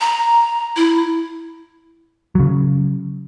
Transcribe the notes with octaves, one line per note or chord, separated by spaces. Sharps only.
A#5
E4
C#3 F#3